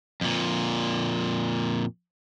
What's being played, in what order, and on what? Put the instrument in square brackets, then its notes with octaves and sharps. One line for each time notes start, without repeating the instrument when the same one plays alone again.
[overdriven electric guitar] F2 A#2